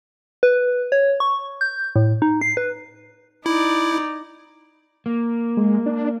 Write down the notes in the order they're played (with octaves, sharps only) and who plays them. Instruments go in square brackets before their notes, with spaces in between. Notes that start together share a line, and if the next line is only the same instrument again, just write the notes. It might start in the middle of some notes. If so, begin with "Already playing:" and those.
[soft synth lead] B4
C#5
C#6
G6
A2
D#4
C7
B4
[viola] D#4 D5 [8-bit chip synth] E4
[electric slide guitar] A#3
[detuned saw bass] G#3
D4